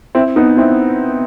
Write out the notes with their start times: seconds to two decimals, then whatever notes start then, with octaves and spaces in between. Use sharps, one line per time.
0.15 C4 E4
0.36 B3 D#4
0.57 C4 E4